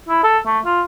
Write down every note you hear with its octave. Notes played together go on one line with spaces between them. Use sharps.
E4
A4
A3
F4